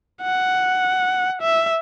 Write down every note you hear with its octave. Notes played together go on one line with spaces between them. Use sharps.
F#5
E5